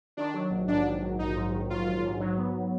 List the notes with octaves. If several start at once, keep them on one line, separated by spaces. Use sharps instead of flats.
D#3 D4
F#3
A#1
G#2 D4
D#3
F#3
A#1 D#4
G#2
D#3
F#3 F4
A#1
G#2
F#3
B3